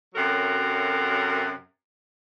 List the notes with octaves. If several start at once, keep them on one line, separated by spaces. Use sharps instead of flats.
F#2 C3 F#3 A4 A#4 F#5